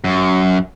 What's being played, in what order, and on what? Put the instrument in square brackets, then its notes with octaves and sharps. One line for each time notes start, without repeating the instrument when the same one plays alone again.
[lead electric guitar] F#2